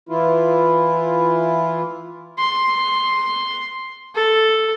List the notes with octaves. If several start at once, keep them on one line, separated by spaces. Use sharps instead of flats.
E3 E4 F4
C6
A4